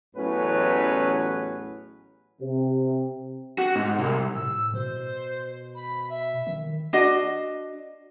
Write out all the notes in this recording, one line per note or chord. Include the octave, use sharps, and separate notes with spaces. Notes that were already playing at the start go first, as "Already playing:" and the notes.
A1 E2 A2 F#3 C#4 B4
C3
F#4
G#2
C2
A2 E6
B2 C5
B5
E5
D#3
D4 F#4 D#5